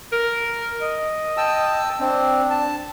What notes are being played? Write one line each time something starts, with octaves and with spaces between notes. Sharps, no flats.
A#4
D#5
G5 A5 E6
C4 D4
A5